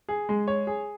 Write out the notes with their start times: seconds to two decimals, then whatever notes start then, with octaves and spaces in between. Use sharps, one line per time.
0.09 G#4
0.29 G#3
0.47 C#5
0.67 G#4